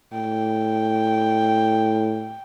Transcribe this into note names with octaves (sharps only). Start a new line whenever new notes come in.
A2 G5